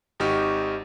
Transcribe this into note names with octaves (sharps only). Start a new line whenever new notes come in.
G#1 D#4 F#4 G4 C#6 F6